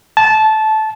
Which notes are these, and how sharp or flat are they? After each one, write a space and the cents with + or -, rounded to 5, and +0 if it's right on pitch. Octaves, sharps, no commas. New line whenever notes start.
A5 -15